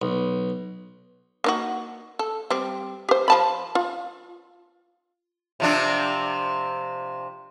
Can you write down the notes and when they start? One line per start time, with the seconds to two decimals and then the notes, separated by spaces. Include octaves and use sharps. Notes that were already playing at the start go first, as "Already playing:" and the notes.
0.02 B1
1.44 A#3 D#4 F#4
2.19 A4
2.50 G3 C4
3.09 G4 C5
3.28 F3 A5 B5
3.75 F4
5.60 C3 F3 D4